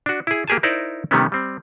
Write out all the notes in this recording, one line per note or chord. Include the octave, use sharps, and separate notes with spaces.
D4 F#4
E4 G#4
A#3 G4 G#4 G#5 A5
D#4 E4 A#4 C5 D5
C3 D#3 G3 A3 B3 C#4
G3 C4